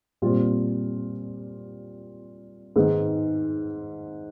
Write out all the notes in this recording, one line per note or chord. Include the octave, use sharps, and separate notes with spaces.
A#2 G3 C4 F4
G#2 D#3 G#3 B3